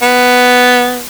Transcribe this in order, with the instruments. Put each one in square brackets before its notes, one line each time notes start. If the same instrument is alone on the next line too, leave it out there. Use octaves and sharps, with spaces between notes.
[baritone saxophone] B3